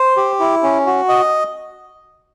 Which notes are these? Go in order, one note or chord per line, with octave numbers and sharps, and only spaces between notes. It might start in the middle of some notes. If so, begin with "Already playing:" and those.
Already playing: C5
G4
E4
C#4
F#4
D#5